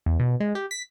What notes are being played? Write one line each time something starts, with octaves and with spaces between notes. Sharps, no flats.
E2
B2
G#3
G4
B6